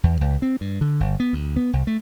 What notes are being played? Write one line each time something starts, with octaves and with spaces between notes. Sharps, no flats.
E2
C#2
C4
G2
D3
G1
B3
D2
B3
C2
A3